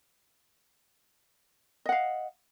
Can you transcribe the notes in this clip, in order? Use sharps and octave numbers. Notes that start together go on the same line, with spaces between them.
D#5 F5 F#5